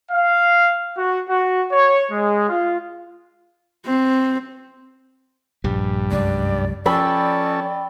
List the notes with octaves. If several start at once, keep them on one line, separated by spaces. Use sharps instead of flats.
F5
F#4
F#4
C#5
G#3
F4
C4
A#1 G2 G3
C2 F#2 G#3 D5
F3 C#4 A4 D5 G5 B5 E6